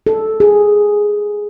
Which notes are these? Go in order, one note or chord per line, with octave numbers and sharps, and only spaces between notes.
A4
G#4